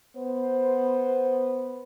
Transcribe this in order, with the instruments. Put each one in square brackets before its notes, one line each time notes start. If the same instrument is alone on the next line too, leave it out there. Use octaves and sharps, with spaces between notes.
[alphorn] B3 [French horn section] C5